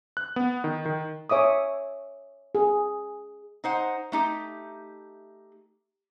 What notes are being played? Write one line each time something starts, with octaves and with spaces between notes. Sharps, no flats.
F#6
B3
D#3
D#3
C#5 E5 D6 D#6
G#4
D#4 C5 F#5
A3 D#4 G4